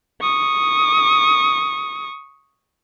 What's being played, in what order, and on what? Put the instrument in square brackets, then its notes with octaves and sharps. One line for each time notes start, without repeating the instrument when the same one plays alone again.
[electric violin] C#6 D#6